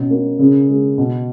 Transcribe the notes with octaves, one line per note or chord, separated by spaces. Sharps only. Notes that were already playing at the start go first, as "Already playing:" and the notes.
Already playing: B2 C#4
A#3
C#3
G#3
B2